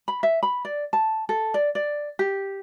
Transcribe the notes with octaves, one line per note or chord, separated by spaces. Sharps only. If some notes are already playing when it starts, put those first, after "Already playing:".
B5
E5
B5
D5
A5
A4
D5
D5
G4